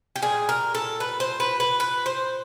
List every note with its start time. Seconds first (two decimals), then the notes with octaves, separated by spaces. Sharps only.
0.16 G4
0.22 A#2 G3 G#4
0.49 A#4
0.75 A4
1.00 B4
1.20 C5
1.40 B4
1.60 B4
1.80 B4
2.06 C5